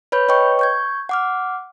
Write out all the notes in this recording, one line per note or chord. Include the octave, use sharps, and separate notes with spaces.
B4 C#5 B5 G6
B4 C#5 D#5 G5 C#6
C#6 G6 G#6
F#5 D6 F6